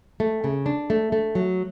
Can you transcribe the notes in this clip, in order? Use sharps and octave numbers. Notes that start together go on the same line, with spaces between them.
A3
C#3
D4
A3
A3
F#3